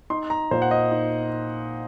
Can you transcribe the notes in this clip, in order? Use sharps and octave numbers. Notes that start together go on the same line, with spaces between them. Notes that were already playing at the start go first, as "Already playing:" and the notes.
D#4 C6
A#5
A#2 C5
F#5
D#5
D#4